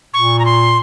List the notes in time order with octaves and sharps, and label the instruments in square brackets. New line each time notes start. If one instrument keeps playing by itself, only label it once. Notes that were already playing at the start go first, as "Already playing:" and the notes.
[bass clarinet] A#2 [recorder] C#6
[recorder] A#5
C6